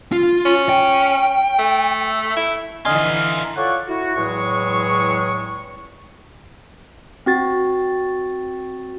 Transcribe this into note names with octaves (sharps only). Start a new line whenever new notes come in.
F4
C#4
G5
A3
E4
D3 E3 D#4 F4 D#5 G#5 F6
F4 A4 C#5 D5 F#5 C#6
E4 F#4
E2 A2 F#3 G#3 C#6
C4 F#4 A6